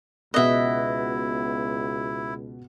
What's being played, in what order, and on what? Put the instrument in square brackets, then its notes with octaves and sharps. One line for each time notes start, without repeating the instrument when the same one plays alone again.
[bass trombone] C#2 [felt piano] B2 G#4 F#6 [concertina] E4 [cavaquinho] D#5 E5